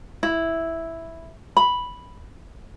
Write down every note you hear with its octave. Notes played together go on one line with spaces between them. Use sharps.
E4
B5